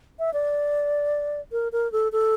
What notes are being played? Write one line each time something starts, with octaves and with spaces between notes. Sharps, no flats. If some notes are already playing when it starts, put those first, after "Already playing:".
E5
D5
A#4
A#4
A4
A4